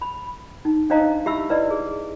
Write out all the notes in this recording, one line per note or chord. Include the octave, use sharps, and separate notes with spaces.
B5
D#4
D4 D#4 C5 D#5 F5 A#5
E4 G4 E5 B5 E6
E4 B4 D5 D#5
G#4